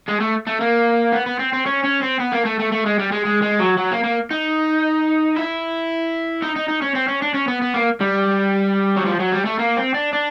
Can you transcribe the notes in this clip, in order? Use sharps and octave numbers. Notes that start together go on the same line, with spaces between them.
G#3
A3
A3
A#3
B3
B3
C4
C4
C#4
C#4
C4
B3
A#3
A3
A3
A3
G#3
G3
G#3
G#3
G#3
F#3
F#3
A#3
A#3
D#4
E4
D#4
D#4
D#4
C#4
C4
C#4
D4
C#4
B3
B3
A#3
G3
F#3
F3
F#3
G3
A3
A#3
C4
D4
D4